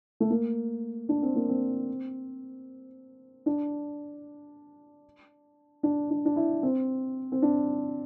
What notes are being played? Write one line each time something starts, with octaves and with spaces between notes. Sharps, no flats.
A3
A#3
D4
C4
A#3
C4
D4
D4
D4
D4
E4
C4
C4
D4